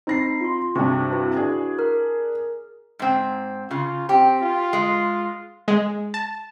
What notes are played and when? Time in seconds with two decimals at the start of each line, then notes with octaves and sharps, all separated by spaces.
0.07 C4 D#4 B5 A#6 C7
0.41 F4 C6
0.75 G2 C3 D4 F#4 C#6
1.12 E4 F#4 B4
1.36 D4 G#4
1.79 A#4
2.99 G#2 C4
3.71 C#3 F4
4.09 C4 G4
4.41 F4
4.73 G#3
5.68 G#3
6.14 A5